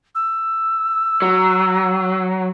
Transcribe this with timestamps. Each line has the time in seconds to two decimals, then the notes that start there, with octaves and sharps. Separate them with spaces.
0.15 E6
1.22 F#3